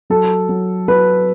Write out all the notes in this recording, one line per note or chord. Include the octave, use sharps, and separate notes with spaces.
F#3 A4
F#3
F#3 B4